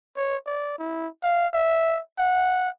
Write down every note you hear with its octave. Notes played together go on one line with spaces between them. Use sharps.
C#5
D5
E4
F5
E5
F#5